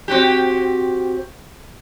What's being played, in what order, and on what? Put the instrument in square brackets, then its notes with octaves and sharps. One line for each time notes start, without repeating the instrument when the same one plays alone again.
[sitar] C4 F#4 G4